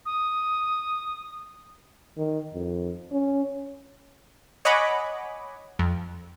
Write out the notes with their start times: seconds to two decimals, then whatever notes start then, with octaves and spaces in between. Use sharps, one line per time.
0.06 D#6
2.17 D#3
2.53 F2
3.12 C#4
4.65 C#5 D#5 F#5 G#5 B5 D6
5.79 F2